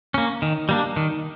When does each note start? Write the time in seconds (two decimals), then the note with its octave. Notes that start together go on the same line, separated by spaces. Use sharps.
0.14 A#3 C#4
0.42 D#3
0.69 G3 A#3 D4
0.96 D#3